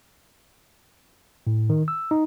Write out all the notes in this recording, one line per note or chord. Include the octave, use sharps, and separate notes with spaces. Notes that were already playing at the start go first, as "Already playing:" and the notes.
A2
D#3
E6
D#4